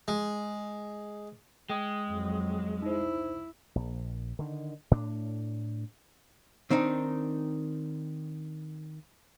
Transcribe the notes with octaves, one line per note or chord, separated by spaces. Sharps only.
G#3
G#3 G5 D#6
F2 F#3
D#4 E4 C5
A#1
D3 D#3
A2 D4
D#3 C4 D4 D#4